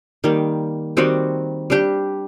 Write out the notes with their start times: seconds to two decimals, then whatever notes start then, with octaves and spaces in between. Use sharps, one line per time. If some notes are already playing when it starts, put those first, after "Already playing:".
0.24 D#3 G3 A#3
0.97 D#3 G3 C4 F#4
1.70 G3 D4 G4